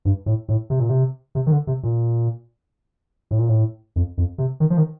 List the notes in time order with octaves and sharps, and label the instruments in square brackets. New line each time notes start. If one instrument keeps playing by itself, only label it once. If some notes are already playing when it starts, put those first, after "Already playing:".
[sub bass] G2
A2
A2
C3
A#2
C3
C3
D#3
D3
C3
A#2
A2
A#2
A2
F2
F2
C3
D#3
F3
D#3